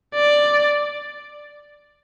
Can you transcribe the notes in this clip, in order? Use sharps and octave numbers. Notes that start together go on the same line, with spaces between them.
D5